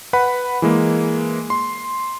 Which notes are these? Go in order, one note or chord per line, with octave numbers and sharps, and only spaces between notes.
B4 F#5 B5
E3 G#3 A#3
C6